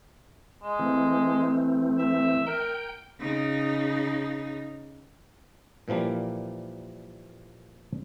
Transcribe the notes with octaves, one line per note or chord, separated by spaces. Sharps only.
G#3
E3 A3 C4
E5
A#4 G5
C#3 D#4
A#2 E3 F3 G3 A#3